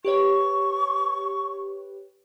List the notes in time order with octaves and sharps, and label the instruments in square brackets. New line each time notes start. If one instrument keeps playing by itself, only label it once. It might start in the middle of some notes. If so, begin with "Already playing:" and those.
[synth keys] G4 B4 C#5 [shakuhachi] C#6